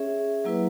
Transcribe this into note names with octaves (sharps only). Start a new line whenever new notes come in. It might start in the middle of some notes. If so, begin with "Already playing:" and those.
Already playing: C#4 G#4 C#5 E5
F#3 A#3 E4 B4